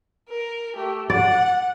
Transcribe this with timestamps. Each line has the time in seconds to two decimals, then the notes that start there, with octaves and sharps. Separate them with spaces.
0.29 A#4
0.76 A3 G4
1.10 D5 F#5